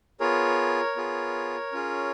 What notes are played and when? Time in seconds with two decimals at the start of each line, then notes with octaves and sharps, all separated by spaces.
0.20 B3 F4 G#4 A#4 C#5
0.96 B3 F4 G#4
1.72 C#4 F4 G#4